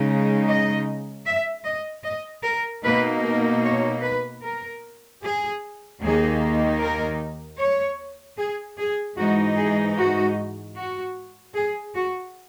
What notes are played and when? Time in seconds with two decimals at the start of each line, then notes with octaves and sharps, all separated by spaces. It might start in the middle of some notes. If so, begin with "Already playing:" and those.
Already playing: C#3 G#3 D#4
0.47 D#5
1.26 E5
1.65 D#5
2.04 D#5
2.45 A#4
2.84 B2 A#3 D#4 B4
3.23 A#4
3.62 C#5
4.02 B4
4.42 A#4
5.22 G#4
6.00 D#2 D#3 A#3 D#4 G#4
6.80 A#4
7.58 C#5
8.38 G#4
8.78 G#4
9.16 G#2 E3 G#3 D#4 F#4
9.57 G#4
9.96 F#4
10.76 F#4
11.54 G#4
11.94 F#4